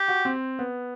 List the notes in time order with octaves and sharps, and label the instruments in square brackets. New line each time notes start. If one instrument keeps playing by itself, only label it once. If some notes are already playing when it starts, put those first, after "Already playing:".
Already playing: [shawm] G4
[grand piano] F#4
C4
B3